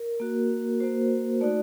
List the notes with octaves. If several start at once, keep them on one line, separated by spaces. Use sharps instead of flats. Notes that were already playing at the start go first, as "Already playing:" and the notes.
Already playing: A#4
A#3 F#4
A#3 F#4 C5
A3 D#4 F#4 D5